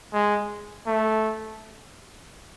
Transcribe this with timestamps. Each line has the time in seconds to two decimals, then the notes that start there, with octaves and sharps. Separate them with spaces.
0.13 G#3
0.87 A3